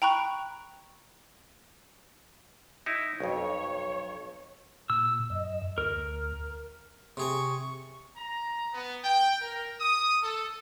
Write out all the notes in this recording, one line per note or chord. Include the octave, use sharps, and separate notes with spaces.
G5 A#5 B5 C#6 F#6
D#4 E4
B1 F2 C#5
A#2 E6
F#2 D#5
D2 A#4
C3 G#4 G#5 C#6
A#5
B3
G5
A#4
D#6
A4